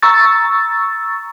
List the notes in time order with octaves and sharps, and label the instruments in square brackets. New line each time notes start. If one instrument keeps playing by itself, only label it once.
[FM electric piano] A#5 C#6 E6 A6